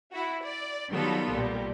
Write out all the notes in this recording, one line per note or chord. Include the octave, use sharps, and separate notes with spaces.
E4 F#4
D5
D#3 F#3 G3 B3 F4 A4
B1 A#2 G3